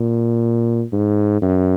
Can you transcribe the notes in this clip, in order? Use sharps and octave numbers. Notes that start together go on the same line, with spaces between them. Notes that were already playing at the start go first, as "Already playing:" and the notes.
Already playing: A#2
G#2
F#2